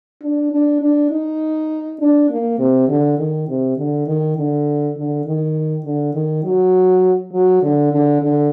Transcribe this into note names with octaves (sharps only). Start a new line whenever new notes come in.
D4
D4
D4
D#4
D4
A#3
C3
D3
D#3
C3
D3
D#3
D3
D3
D#3
D3
D#3
F#3
F#3
D3
D3
D3